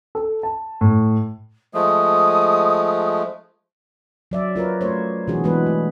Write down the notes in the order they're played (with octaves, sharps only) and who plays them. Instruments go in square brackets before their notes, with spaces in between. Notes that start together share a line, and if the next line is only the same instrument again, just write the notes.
[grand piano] A4
A5
A2
[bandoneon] F3 G#3 A3 [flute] D#6
[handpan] F#3 D5 E5
F4 A#4 B4 C#5
A3 C5 C#5
B2 E3 G3 D4 F#4 G#4
E3 G#3 B3 C4 F#4 B4
A3